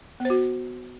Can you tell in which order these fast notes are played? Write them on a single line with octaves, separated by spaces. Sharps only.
B3 C5 F#4